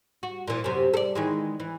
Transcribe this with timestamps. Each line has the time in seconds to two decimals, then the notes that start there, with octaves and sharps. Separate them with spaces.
0.23 F#4
0.48 A#2 E3
0.64 F#2 C3
0.94 A4 D5
1.15 D#3 E3 G#3
1.60 E3